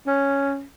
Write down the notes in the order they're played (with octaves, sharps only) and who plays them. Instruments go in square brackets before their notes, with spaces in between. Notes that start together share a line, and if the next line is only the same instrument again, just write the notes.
[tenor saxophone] C#4